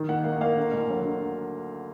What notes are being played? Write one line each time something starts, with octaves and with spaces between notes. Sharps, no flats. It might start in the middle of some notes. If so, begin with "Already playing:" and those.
Already playing: D#3
A#3 F#5
A#3 F5
A#3 F5
D3
D2
F#3
D3